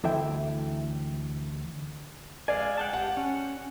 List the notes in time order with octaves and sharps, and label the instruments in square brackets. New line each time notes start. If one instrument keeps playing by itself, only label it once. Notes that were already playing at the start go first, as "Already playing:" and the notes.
[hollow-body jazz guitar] D2 E3 A4 E5 G5
[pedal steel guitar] G#3 F5 G#5 [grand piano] D5
[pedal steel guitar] F#5 G5 A5
[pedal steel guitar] G4 [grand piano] F#5
[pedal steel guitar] C#4